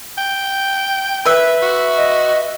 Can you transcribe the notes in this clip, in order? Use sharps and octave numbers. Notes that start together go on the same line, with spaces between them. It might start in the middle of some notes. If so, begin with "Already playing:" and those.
G5
B4 E5
F#4
D#5